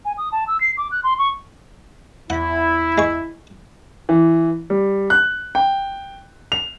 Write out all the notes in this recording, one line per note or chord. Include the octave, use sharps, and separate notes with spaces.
G#5
D#6
A5
E6
C7
D6
F#6
C6
C#6
E2 E4 F#5
G#3 C#6
E3
G3
F#6
G5
F7